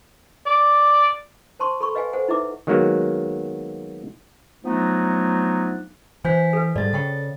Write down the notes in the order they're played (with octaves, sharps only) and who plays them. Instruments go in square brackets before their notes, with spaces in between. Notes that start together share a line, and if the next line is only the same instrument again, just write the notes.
[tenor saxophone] D5
[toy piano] C5 A5 C6 C#6
A4 B5 C#6
B4 D#5 F5 G5 G#5
A4 C5 F#5 G#5
D#4 E4 B4 E5 D6
[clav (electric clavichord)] D#3 F#3 G#3 A#3 B3 F#4
[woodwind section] F3 F#3 A3 B3 D4 D#4
[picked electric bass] E3 [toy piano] C5 [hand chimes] G#5 G6 B6
[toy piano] A4 B4
[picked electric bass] G#2 G3 [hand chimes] A4 A6 [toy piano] D5
[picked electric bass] C#3 [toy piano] F#5 G5 C#6